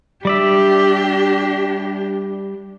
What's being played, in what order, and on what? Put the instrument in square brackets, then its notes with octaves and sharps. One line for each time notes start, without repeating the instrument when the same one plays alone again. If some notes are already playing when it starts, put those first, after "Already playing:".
[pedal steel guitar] G3 D5 E5 [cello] D4 G4